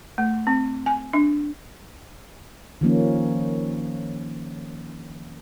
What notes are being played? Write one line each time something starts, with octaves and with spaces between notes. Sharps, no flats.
A3
C4
G#5
D4
D#3 F3 A#3 C#4